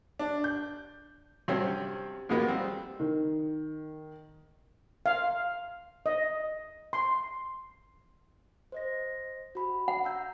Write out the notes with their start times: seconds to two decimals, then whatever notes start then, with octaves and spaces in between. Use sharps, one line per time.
0.19 D4
0.44 G6
1.48 G2 C3 F#3 C4 C#4
2.29 D#2 B2 G#3 A#3 B3
2.48 G3 C4
3.00 D#3
5.06 F5
6.06 D#5
6.93 C6
8.72 C5 D#5 A#6
9.55 F#4 B5
9.88 F#5
10.04 A#5 E6 G6